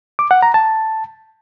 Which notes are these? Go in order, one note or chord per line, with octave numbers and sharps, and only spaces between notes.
D6
F#5
A#5
A5